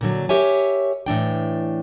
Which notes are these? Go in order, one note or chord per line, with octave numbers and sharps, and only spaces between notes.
A#2 D3 F#3
G4 A#4 C#5 E5 G#5
A2 E3 D4 G5